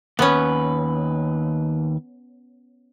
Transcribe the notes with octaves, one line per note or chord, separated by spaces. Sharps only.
D#2 B3 C#4 B4